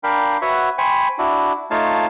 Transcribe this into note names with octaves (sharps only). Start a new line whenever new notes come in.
D4 A#4 F5 G5 B5
F#4 B4 C#5 E5 F#5
C5 G5 G#5 B5 C#6
D4 E4 F#4
A3 D#4 F4 C#5 F5 A5